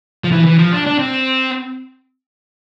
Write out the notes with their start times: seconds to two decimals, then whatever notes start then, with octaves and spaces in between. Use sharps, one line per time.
0.24 F3
0.31 E3
0.46 E3
0.58 F3
0.72 D4
0.86 D4
0.99 C4